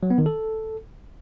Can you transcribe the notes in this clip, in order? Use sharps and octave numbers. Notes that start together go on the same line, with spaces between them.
F#3
B3
D#3
A4